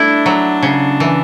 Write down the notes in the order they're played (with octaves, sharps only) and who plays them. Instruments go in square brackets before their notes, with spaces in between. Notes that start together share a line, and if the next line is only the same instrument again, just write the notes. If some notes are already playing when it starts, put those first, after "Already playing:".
Already playing: [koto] G3 A3 E4 [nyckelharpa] D4
[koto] F#3
C#3
E3